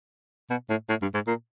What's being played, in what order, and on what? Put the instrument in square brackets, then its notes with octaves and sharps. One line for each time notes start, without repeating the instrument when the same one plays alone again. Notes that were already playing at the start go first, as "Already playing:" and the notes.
[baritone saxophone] B2
A2
A2
G2
G#2
A#2